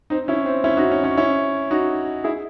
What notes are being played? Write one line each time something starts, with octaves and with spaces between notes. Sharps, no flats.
C4 D#4
C#4 E4
C4
C#4 E4
D#4 F#4
C#4
C#4
C#4 E4
D#4 F#4
E4 G#4